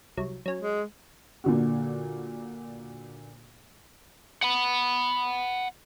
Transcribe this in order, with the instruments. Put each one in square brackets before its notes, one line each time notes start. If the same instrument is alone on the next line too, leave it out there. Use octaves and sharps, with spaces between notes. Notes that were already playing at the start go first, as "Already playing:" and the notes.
[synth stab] C2 F#3
F#3 C#4
[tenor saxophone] G#3
[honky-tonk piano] A#2 D3 F#4
[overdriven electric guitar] F#5 B5